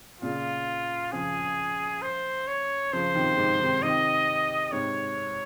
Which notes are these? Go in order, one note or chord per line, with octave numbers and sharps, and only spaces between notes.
A#2 C#3 F4
C#3 F3 G#4
C5
C#5
C#3 F3 C5
C3 D#3
G#2 C3
C3 D#3
C3 D#3 D#5
G#2 C3 C#5